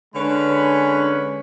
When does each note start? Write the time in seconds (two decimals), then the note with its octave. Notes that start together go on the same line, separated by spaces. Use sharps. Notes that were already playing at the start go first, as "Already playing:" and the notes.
0.14 D3 G#3 C#4 B4 B5